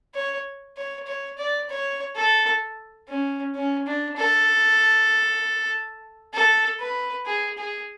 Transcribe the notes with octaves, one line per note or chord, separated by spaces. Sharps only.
C#5
C#5
C#5
D5
C#5
A4
C#4
C#4
D4
A4
A4
B4
G#4
G#4